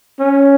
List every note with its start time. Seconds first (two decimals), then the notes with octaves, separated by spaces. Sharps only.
0.20 C#4